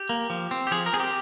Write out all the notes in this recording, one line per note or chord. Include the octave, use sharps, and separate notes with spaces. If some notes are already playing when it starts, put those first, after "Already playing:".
Already playing: G4
A#3
F3
C4
G4
F3 G#4
A#4
C4 G#4
G4